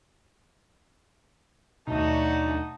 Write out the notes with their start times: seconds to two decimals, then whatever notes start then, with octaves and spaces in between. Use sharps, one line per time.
1.88 D#2 B2 F#3 A3 D4 D#4 F#4